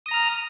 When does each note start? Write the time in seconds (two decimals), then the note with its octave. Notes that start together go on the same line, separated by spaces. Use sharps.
0.06 D#6
0.09 A#6
0.11 A#5
0.14 F6